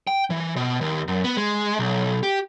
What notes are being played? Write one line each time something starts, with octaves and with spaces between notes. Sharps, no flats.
G5
E3
B2
D#2
F#2
B3
G#3
B1
G4